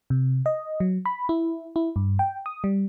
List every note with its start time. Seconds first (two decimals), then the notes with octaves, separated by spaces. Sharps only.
0.10 C3
0.46 D#5
0.80 F#3
1.06 B5
1.29 E4
1.76 E4
1.96 G2
2.19 G5
2.46 D#6
2.64 G3